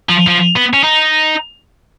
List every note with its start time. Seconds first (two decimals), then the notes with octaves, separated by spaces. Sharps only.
0.09 F3
0.28 F3
0.56 B3
0.73 C#4
0.84 D#4